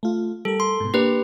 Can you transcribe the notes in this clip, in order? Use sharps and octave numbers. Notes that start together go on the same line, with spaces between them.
A3 F4
G3 A4 A#4
C6
G#2 B2
A#3 D4 G4 B4